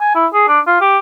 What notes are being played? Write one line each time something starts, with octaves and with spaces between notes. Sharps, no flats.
G#5
E4
G#4
D4
F4
G4